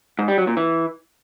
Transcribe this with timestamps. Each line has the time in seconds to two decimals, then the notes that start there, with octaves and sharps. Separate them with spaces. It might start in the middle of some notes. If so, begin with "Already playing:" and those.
0.19 G#2
0.28 G3
0.38 F#3
0.47 A#2
0.57 E3